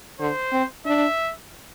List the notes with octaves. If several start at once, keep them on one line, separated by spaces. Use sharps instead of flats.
D3 C5
C4
D4 E5